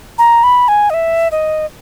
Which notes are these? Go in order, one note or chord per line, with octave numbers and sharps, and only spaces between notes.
A#5
B5
G#5
D#5
E5
D#5